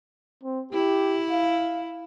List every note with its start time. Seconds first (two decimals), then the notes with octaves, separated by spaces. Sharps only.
0.43 C4
0.73 E4 G4
1.31 F5